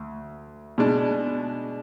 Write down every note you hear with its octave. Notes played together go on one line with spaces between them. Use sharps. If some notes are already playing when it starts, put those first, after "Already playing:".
Already playing: D2
B2 G#3 D4